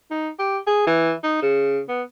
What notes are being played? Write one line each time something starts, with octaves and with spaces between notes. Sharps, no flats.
D#4
G4
G#4
E3
D#4
C#3
B3